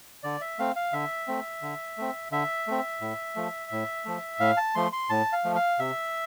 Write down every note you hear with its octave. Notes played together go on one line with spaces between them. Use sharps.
D3 D5
E5
A3 C4 F5
F5
D3 E5
A3 C4
D3
A3 C4
D3 E5
A3 C4
A2
F3 A3
A2
F3 A3
A2 F5
A5
F3 A3 C6
C6
A2 A5
F5
F3 A3
F5
C3 E5